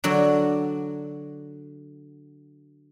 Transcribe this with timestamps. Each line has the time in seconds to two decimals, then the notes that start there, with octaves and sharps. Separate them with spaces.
0.04 D3 F#3 F#4 D5